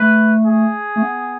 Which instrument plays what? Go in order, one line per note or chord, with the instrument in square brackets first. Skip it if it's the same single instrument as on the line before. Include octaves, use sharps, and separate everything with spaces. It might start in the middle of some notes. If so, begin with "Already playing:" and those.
Already playing: [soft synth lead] A3 [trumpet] B4
[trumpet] G#4
[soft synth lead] A3
B3